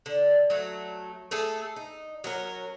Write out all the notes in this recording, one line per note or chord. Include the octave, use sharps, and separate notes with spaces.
D3
F#3 A3
A3 G#4 A4
D#4
F#3 C#4 A#4